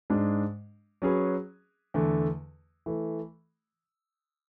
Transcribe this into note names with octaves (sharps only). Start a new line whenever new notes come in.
G#2 G#3 D4
F#3 C#4 G#4 B4
E2 D3 A3
E3 A3